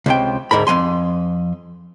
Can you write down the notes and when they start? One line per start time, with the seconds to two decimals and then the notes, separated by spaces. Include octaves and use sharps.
0.06 C#2 C3 G5
0.51 D2 G#2 A#4 B5
0.67 F2 F3 G#5 C6